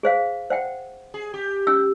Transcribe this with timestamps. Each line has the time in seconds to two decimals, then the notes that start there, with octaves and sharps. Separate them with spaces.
0.03 G#4 C5 F5
0.50 C5 F#5 G5
1.14 G#4
1.34 G4
1.67 C#4 E6